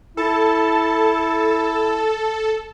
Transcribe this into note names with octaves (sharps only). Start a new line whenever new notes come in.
E4 A4 A5